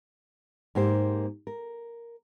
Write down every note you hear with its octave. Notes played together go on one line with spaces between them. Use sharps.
G#2 A#3 G4 C5
A#4